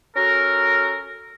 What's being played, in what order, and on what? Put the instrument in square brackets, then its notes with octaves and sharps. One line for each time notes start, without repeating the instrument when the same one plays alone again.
[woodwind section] C#4 F#4 A4 A#4